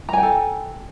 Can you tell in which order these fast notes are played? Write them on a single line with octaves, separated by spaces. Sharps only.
A#5 G#5 G5 A4